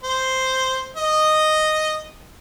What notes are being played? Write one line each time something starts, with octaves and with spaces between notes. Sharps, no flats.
C5
D#5